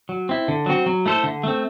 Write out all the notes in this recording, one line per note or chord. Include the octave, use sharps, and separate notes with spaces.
F#3
C4 E4
D3
F#3 C4 F#4
F#3
A3 E4 A4 C5
D3
A3 C4